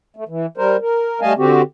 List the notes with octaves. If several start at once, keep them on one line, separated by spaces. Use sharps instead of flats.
A3
E3
G3 A#4 C5
A#4
G3 A3 D#5 F5 G#5 A5
D3 C4 F#4 G4